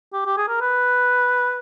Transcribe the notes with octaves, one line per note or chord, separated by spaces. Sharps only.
G4
G4
G#4
A#4
B4